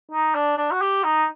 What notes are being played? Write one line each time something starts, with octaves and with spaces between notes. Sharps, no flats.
D#4
D4
D4
F#4
G4
D#4